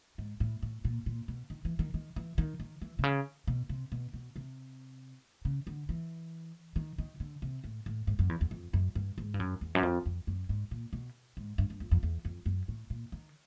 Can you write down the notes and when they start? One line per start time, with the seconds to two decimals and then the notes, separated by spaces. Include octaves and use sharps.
0.18 G#2
0.40 A2
0.63 A2
0.85 A#2
1.06 A#2
1.28 B2
1.50 D#3
1.65 E3
1.79 D#3
1.94 D#3
2.16 E3
2.38 D#3
2.60 D#3
2.82 E3
2.99 C3
3.03 C#3
3.47 B2
3.69 C3
3.92 B2
4.13 B2
4.36 C3
5.45 C#3
5.67 D3
5.89 E3
6.76 D#3
6.98 D#3
7.20 D3
7.42 C3
7.64 A2
7.86 A2
8.07 G#2
8.19 F#2
8.29 E2
8.41 E2
8.51 F2
8.73 F#2
8.95 G2
9.18 G#2
9.34 G2
9.40 F#2
9.61 E2
9.75 F#2
9.83 F2
10.06 F2
10.27 F#2
10.49 G#2
10.71 A#2
10.93 B2
11.37 G#2
11.58 G2
11.70 G2
11.80 F2
11.91 F2
12.03 E2
12.25 F2
12.46 F#2
12.68 A2
12.90 A#2
13.12 D#3